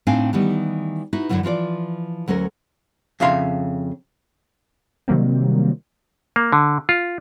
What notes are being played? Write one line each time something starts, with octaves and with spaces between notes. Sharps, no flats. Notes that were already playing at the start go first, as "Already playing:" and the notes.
A2 C4 D4 D#4 F5 G#5
D#3 E3 G3 B3
D#4 E4 F#4 B4
F#2 D3 D#3 F#3 E4
E3 F3 F4 D5
D2 F#3 C#4 A4 A#4
F2 C#3 E5 F5 C6
C3 D#3 F#3 G3 A#3 C4
A#3
D3
F4